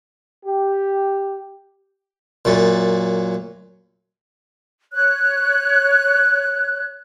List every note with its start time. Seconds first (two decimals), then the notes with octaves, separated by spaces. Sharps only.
0.45 G4
2.45 F#2 A#2
4.93 C#5 F#6